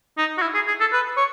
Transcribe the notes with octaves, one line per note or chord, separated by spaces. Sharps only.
D#4
F#4
E4
G#4
G#4
A4
B4
C#5